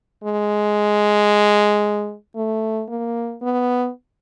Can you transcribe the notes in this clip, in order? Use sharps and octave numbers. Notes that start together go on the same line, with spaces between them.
G#3
A3
A#3
B3